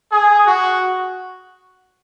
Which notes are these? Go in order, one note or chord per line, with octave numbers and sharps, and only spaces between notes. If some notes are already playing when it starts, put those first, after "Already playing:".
G#4
F#4